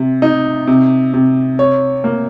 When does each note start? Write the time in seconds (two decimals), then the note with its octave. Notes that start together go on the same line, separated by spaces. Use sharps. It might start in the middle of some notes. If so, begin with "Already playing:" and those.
Already playing: C3
0.22 D#4
0.68 C3
1.14 C3
1.59 C#5
2.04 A#3